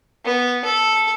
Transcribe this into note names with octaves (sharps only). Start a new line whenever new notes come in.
B3
A4